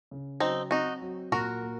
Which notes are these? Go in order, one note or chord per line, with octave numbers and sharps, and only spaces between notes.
C#3
F#3 C4 D#4
C4 D#4 F#4
F#3
A#2 F#4 A#4
A#3